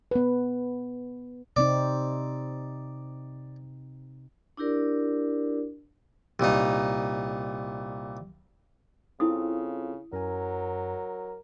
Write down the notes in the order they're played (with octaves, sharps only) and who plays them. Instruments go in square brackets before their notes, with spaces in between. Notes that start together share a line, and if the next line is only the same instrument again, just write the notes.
[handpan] B3 B4
[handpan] C3 C4 D#4 [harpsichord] D5
[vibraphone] D4 E4 G4 A#4 D5
[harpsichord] C2 A#2 D#4
[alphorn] C#3 [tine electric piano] C4 F4 A4 [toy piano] E4 D#6
[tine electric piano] F#2 G#5 [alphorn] F#3 [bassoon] A#4